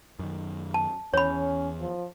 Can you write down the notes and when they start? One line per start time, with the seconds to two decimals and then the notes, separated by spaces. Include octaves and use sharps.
0.19 F#2 D#3
0.74 A5
1.14 E2 C#4 C#5 B5
1.80 F3